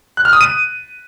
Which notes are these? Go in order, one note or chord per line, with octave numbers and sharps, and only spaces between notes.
F#6
F6
D#6
D#7